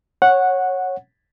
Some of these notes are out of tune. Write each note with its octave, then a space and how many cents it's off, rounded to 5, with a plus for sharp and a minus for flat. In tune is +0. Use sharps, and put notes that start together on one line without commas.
C#5 -15 F#5 -5